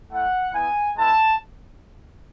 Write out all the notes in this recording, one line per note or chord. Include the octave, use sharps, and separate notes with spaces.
A3 E4 F#5
B3 E4 G#5
G#3 B3 E4 A5